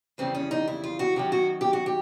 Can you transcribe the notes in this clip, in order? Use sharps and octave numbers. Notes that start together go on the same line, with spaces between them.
F2 C#3 E3 G3 C4
C#4
D#4
E4
F4
F#4
F#2 D#3 F#3 G4
F#4
G4
F#4
G4